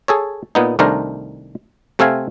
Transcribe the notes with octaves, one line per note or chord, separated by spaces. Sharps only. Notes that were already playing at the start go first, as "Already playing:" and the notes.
G#4 A4 C#5
A#2 B3 D#4
C2 D#3 A3 D4 A#4 C5
C3 A3 C4 E5 F5 G#5